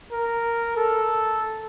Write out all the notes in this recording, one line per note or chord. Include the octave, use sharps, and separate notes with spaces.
A#4
A4